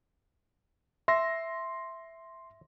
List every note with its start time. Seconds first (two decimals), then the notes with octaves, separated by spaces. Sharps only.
1.08 E5 C6 A#6